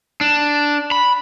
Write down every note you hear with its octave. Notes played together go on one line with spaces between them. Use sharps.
D4
B5